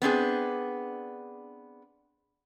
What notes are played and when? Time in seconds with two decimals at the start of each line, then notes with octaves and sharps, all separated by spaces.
0.02 B3 C4 D4 G#4